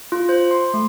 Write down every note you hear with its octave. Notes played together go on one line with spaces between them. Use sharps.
F4
C5
C6
A3